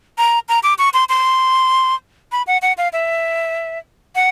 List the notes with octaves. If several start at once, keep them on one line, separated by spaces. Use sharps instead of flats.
A#5
A#5
D6
C#6
C6
C6
B5
F#5
F#5
F5
E5
F#5